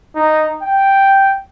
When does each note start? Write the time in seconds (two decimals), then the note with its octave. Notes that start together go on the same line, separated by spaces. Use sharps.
0.15 D#4
0.62 G5